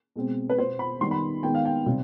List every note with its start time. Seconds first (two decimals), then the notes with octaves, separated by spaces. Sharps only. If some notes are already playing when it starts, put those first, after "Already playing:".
0.16 B2 G#3 C4
0.50 B4
0.57 B2 C5
0.62 B3
0.79 B5
1.01 D#3 G3 B3 C6
1.11 B5
1.43 D#3 G#3 B3 G5
1.55 F5
1.65 G5
1.86 C3 G3 C4